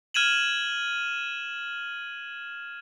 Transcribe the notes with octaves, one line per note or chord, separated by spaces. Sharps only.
F6 G#6 D#7 E7 F#7